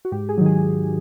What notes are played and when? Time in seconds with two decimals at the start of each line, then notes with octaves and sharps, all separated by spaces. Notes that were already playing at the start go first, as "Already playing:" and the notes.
0.05 F#4
0.12 G#2 G4
0.29 G#4
0.38 D#3 F#3
0.46 G#4